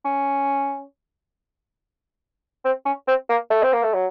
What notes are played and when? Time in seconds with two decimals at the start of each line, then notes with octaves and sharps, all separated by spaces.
0.05 C#4
2.65 C4
2.86 C#4
3.08 C4
3.30 A#3
3.50 A3
3.63 C4
3.73 A#3
3.83 A3
3.94 F#3